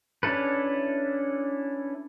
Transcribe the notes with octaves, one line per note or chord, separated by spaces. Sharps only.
C#4 D4 E4 A4 B4